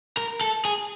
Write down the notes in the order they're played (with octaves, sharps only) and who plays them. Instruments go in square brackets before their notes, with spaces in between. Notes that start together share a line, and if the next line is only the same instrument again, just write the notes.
[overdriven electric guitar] A#4
A4
G#4